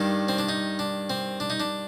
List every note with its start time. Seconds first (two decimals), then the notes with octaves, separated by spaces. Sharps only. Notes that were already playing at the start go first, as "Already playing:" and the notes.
Already playing: G2 D#3 D4
0.28 C4
0.39 D4
0.49 D#4
0.79 D4
1.10 C4
1.40 D4
1.50 D#4
1.60 D4